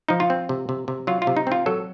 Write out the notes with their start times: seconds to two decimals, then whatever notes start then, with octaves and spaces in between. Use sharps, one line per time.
0.08 F3 D#4
0.20 F4
0.30 C4
0.49 C3
0.69 C3
0.88 C3
1.07 F#3 F4
1.22 F4
1.27 C3
1.37 D#4
1.47 C4 F4
1.66 F#3 A4